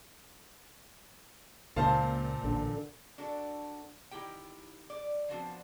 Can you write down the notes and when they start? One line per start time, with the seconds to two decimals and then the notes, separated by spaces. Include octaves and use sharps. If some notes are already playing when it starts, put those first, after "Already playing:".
1.76 C#2 A#2 C5 F5 A5
2.44 A1 D3
3.18 D4 F#4 A4
4.11 D#3 E4 G4 G5
4.90 D5
5.29 F3 B3 C4 D4 F#4